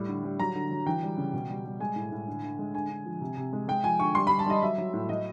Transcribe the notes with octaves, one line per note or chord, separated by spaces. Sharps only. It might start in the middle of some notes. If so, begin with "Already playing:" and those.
Already playing: A2 G3
D3
G3
F#3 A#5
D3
F#3
E3 G5
G3
C#3
B2
G3
G3
G#3 G#5
A2
A2
D3
D3
G#3
D3 G#5
D3
F3
C3
C3
G#3
G#3 G5
F3 G#5
D3 C#6
G3 C6
B5
G3
A5
G3 D#5
F#3 E5
F#3
A2
F#3 D#5